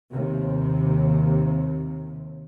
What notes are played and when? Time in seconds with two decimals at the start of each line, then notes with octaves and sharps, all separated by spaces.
0.10 D#2 C3